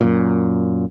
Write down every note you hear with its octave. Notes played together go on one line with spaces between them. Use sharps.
F#2 A#2